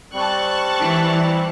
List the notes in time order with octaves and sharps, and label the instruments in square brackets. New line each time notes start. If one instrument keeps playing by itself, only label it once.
[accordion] G3 C4 [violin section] A5 C#6 F#6
[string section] E3